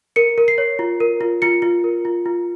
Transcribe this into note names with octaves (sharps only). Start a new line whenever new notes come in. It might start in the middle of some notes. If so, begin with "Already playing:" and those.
A#4 C#7
A#4
C7
C#5
F4
A#4
F4
F4 C#7
F4
A#4
F4
F4